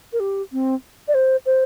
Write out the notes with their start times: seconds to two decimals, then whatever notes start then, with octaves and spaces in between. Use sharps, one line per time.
0.13 A#4
0.20 G4
0.52 C4
1.08 D5
1.14 C5
1.46 C5